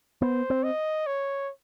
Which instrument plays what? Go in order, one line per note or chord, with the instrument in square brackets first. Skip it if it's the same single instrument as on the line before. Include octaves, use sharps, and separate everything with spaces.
[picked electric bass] B3 [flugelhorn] C5
[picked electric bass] C4
[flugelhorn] D#5
C#5